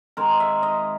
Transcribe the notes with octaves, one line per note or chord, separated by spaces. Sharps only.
D#3 G#3 C4 A#4
E5
D#5